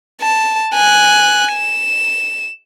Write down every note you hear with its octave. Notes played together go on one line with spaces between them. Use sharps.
A5
G#5 F#6
E7